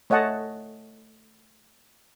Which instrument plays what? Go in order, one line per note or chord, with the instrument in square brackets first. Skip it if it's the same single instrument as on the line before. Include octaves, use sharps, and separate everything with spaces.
[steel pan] A3 C#5 D#5 F#5 A5